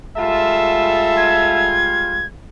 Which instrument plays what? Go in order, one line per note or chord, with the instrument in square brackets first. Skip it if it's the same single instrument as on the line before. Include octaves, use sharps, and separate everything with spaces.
[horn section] G3 G#3 F4 [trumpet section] A4 E5 A5
[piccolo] G#6